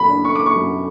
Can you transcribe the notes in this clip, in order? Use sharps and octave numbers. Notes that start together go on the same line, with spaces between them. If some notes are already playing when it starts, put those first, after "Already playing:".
Already playing: F#2 B5
D4
C#6
D6
C#6
F#2